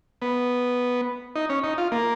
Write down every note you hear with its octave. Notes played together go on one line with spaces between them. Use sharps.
B3
D#4
C#4
D#4
F4
A#3